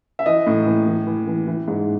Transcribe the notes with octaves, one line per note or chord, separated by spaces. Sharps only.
E5
E3 D#5
A2
E3
E3
E3
E3
E3
G#2